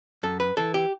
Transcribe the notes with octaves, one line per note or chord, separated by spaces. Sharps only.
F#2 A4
B4
E3 A4
G4